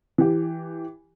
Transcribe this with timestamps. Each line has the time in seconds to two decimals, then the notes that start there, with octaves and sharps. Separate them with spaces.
0.18 E3 G4